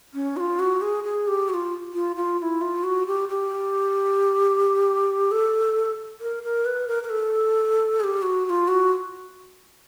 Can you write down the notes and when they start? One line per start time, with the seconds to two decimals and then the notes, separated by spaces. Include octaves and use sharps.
0.14 C#4
0.37 F#4
0.40 F4
0.59 F#4
0.81 G#4
1.04 G#4
1.27 G4
1.49 F#4
1.54 F4
1.94 F4
2.16 F4
2.39 F4
2.42 E4
2.61 F4
2.83 F#4
3.07 G4
3.29 G4
5.31 A4
6.21 A#4
6.43 A#4
6.65 B4
6.88 A#4
7.03 A#4
7.10 A4
8.00 G#4
8.04 G4
8.22 F#4
8.45 F#4
8.49 F4
8.68 F#4